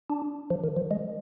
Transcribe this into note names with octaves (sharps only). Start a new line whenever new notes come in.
D4
F3
D#3
F3
G#3